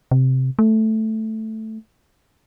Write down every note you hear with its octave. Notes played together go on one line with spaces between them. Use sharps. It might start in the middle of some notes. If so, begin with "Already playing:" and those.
C3
A3